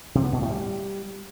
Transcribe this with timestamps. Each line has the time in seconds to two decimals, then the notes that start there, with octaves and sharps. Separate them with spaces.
0.15 C3
0.24 B3
0.33 B2
0.42 A2
0.50 G3